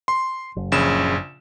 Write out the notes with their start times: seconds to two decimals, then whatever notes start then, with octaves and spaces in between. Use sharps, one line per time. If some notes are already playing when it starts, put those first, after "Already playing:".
0.08 C6
0.56 F#1
0.72 A#1 C#3 E7